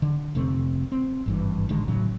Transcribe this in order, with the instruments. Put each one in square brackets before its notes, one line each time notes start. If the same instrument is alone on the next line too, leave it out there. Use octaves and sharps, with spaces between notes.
[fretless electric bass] D3
F1 C3 A3 C4
C4
G#1 G2 E3
A1 D3 D#3 G#3
A2 C#3 F#3